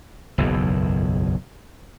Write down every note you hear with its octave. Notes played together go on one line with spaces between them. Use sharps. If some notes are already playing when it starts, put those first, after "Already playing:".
F#1 B1 E2